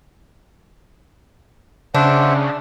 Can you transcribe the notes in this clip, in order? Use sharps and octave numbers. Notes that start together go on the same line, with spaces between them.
C#3 D4 C5 E5 F#5